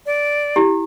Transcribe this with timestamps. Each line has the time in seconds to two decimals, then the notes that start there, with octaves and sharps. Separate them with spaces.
0.06 D5
0.56 E4 G4